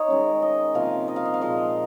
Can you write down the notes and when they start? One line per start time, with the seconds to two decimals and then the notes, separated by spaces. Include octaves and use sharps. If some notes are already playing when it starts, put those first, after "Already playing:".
Already playing: D#4 C#5 D#5
0.08 D#3 G#3 C#4
0.42 D#5
0.74 C3 F3 A#3 D#4 F5
1.08 D#5
1.16 F5
1.25 D#5
1.34 F5
1.41 A#2 F3 G#3 D#5